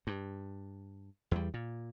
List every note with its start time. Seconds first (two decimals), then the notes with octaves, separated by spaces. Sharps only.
0.07 G2
1.31 E2 G3
1.54 A#2